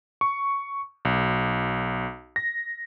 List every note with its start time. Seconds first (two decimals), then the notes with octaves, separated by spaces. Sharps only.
0.21 C#6
1.05 B1
2.36 A#6